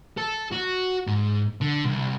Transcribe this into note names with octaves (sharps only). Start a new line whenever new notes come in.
A4
F#4
G#2
D3
C2